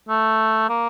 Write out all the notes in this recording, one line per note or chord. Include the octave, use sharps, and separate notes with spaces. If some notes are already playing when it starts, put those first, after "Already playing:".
A3
A#3